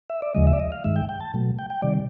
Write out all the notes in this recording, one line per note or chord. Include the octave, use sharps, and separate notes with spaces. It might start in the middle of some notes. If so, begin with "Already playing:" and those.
E5
D5
D#2 C#3 F3 G#3 D#5
E5
D5
D#5
F5
G2 D#3 G#3 E5
G5
G5
A5
B2 F#3 A3
G5
G5
C3 D#3 G3 D5